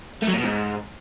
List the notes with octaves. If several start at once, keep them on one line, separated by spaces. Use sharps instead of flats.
A3
F#3
A#2
B2
G#2